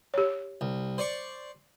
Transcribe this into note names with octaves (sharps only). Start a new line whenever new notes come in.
G4 C#5
C2
C5 D5 C#6